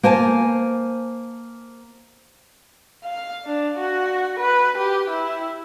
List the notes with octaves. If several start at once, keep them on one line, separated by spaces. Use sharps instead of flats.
A#3 C5 G#5 A5
F5
D4
F#4
B4
G4
E4